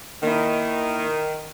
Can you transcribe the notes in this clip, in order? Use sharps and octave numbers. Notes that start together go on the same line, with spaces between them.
D#2 D#3 E4